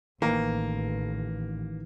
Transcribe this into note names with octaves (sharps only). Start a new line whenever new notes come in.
A1 D#3 E3 A#3